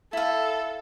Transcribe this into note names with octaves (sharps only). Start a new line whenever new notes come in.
E4 A4 F5